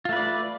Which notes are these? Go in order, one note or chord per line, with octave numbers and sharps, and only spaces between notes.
A3 F4 B4 D5